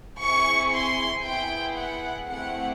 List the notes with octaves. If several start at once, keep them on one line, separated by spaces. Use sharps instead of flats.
C4 E4 G#4 C#6
C6
B3 E4 G#4 G5
F#5
A3 C4 E4 G4 F#5